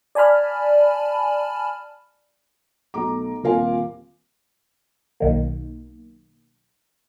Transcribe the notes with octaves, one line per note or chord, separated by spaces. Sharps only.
D5 G#5 A5 B5 F6
B1 A3 A#5 D6
D#1 C4 F4 A#4 F5 G#5
B1 D#3 A#3